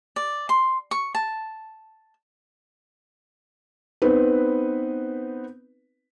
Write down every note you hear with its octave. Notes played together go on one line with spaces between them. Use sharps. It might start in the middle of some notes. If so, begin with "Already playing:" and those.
D5
C6
C#6
A5
B3 C4 D#4 B4